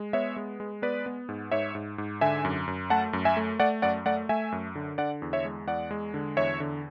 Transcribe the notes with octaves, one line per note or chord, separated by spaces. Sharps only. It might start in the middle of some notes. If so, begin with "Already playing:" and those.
Already playing: G#3
B3 C#5 E5
G#3
G#3
B3 B4 D5
B3
G#2
G#2 C#5 E5
G#2
G#2
D3 E5 G#5
F#2
F#2
A3 F#5 A5
F#2
E5 G#5
A3
A3 D5 F#5
F#2 D5 F#5
A3 D5 F#5
A3 E5 G#5
F#2
D3
D3 D5 F#5
E2
C#5 E5
G#3
E2 D5 F#5
G#3
D3
E2 C#5 E5
D3